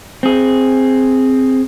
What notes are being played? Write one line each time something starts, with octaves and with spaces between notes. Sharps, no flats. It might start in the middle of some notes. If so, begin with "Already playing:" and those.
C4 G#4